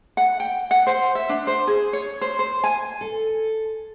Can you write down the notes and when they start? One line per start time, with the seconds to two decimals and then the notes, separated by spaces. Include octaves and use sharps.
0.17 F#5
0.40 G5
0.71 F#5
0.87 C5
1.15 E5
1.29 D4
1.47 C5
1.67 G#4
1.93 C#5
2.21 C5
2.39 C5
2.64 G#5
3.01 A4